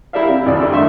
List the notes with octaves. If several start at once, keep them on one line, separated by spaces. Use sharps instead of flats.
E4 G4 A#4 D5 E5 F5
C3
G#1 C#2 D5
G2 D3 E6
A2 D#3 E5 C6 C#6